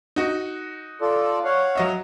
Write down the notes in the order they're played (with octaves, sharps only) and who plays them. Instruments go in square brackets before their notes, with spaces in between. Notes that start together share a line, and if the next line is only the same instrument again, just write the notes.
[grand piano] D#4 F#4
[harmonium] F4 A4 D5
C#5 F5 F#5
[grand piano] F#3 D#5 E5